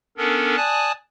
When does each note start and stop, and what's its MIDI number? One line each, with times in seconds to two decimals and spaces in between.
0.17 0.56 59
0.17 0.56 61
0.17 0.56 62
0.17 0.56 69
0.17 0.56 70
0.57 0.92 74
0.57 0.92 80
0.57 0.92 81
0.57 0.92 87
0.57 0.92 90